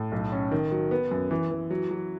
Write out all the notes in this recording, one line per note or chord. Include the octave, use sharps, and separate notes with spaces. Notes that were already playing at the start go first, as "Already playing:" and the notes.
Already playing: A2
B1
C#4
D#3
F#3
B3
F#2
E3
E3
F#3
F#3